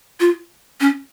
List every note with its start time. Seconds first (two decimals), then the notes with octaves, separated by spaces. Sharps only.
0.20 F4
0.80 C#4